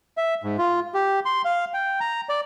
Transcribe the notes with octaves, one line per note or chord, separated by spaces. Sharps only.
E5
G#2
F4
G4
C6
F5
G5
A#5
D5